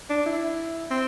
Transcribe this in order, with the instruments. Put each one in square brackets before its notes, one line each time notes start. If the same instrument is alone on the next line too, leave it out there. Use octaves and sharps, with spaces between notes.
[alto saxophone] D4
E4
C4